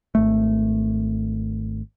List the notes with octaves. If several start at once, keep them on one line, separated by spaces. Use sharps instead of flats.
G#1 A3